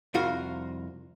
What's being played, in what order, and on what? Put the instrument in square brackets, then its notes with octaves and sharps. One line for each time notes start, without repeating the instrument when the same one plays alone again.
[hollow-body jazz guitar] C2 F2 F4 F#4 A#4